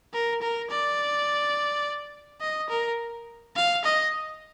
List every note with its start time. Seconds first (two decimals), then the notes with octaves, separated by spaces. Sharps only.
0.13 A#4
0.42 A#4
0.70 D5
2.41 D#5
2.70 A#4
3.56 F5
3.84 D#5